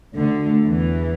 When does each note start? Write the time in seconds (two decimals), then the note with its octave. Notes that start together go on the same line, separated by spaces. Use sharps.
0.16 D2 D3
0.64 E2 E3